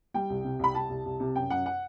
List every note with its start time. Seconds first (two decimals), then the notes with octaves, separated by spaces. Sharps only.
0.14 G3 G5
0.30 C2
0.44 C3
0.59 C2 B5
0.75 C2 A5
0.89 C2
1.05 C2
1.20 C3
1.35 F#2 G5
1.50 F#2 F#5
1.66 F#5